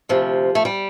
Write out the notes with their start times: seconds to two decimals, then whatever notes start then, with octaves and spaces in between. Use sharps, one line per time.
0.09 D2 C3 F3
0.55 A3
0.65 G3